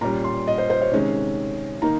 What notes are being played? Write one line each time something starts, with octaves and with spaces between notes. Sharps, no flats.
A#2 G3 C#4 A#5
C6
D#5
C5
C5
C#5
C3 D#3 G#3 C#4
D#3 A#3 D#4 A#5